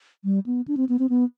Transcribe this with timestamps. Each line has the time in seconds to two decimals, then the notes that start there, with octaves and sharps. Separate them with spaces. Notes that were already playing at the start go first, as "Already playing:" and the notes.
0.24 G3
0.46 B3
0.68 D4
0.77 C4
0.89 B3
0.99 C4
1.09 B3